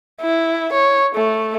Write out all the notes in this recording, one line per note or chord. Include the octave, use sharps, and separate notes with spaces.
E4
C#5
A3